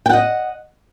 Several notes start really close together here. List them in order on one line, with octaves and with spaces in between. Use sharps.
G5 F#5 D#5